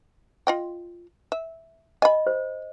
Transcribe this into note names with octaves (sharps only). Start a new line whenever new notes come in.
F4 D#5 G5
E5
D#5 G#5 B5
C5